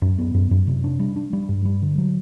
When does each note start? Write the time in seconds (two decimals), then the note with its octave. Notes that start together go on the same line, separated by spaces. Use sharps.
0.02 F#2
0.19 B3
0.34 F#2
0.51 F#2
0.67 C3
0.84 D4
0.99 G3
1.16 D4
1.33 G3
1.49 G2
1.65 G3
1.82 D3
1.98 F#3